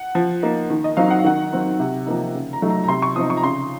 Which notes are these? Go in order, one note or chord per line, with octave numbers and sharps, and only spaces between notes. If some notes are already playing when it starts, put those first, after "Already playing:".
Already playing: F#5
F3
A#3 D#4
D#3
D#5
F#3 C4 D#4 F5
F#5
F5
D#3 F#5
F#3 C4 D#4
C3
F3 A#3 D#4
C#3
A#5
F#3 A3 D#4
A#5
A#5
C3 C6
C#6
F3 C4 D#4 D#6
C#6
A#5
C#3 C6